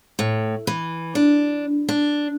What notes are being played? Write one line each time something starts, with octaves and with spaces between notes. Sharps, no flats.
A2
E3
D4
D4